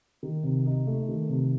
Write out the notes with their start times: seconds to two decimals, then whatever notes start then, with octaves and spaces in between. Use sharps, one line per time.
0.23 D#3
0.43 C3
0.66 D#4
0.87 A3
1.08 D#3
1.29 C3